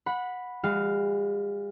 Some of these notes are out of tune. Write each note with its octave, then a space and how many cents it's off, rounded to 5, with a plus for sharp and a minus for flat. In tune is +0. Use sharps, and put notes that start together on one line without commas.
F#5 -20 B5 +0
G#3 -45 F#4 +0 F5 +0